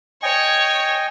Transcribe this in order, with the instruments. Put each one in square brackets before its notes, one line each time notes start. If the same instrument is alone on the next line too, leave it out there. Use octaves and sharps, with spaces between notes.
[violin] C#5 [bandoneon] D#5 G5 G#5